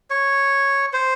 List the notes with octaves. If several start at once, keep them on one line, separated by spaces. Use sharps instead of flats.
C#5
C5